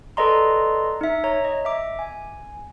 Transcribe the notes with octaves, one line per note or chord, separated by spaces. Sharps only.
A4 B4 D5 D#5 A#5 C6
D#4 E5
C#5 A#5
D#5
E5 D6
G#5